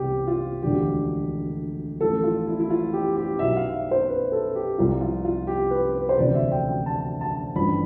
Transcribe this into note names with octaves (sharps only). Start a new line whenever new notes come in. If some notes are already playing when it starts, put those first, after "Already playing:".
Already playing: C2 C3 E3 G4
F4
E1 D2 D3 F3 G4
A1 A2 F3 A4
F4
E4
E4
F4
G4
G4
B1 B2 E5
F5
E5
C5
B4
A4
G4
C2 C3 F3 F4
F4
F4
G4
B4
B4
C5
E1 D2 C3 F3 D5
E5
G5
G5
A5
A5
A1 G2 F3 B5